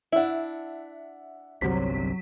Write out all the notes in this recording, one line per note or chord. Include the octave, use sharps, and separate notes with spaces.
D4 E4 E5 F#5
G1 C2 C3 F#3 B6